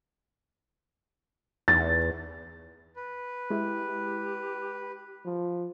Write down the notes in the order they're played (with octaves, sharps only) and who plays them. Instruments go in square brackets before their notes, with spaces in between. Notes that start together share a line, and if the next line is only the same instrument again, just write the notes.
[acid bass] E2 [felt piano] A6
[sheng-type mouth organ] B4
[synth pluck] G#3 E4 [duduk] G4
[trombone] F3